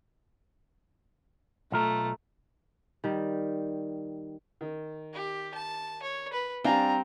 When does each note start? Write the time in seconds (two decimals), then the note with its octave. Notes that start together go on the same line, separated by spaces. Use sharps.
1.72 B1 A3 F4 A#5
3.04 D#3 G3
4.61 D#3
5.13 G4
5.54 A5
6.03 C#5
6.33 B4
6.64 G3 C4 D4 F5 G#5 A#5